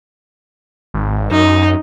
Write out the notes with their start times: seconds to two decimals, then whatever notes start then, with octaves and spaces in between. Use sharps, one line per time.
0.94 G#1
1.31 F#2 D#4